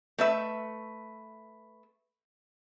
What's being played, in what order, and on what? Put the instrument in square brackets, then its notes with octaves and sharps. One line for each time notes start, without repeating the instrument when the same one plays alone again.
[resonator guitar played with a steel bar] A3 B4 E5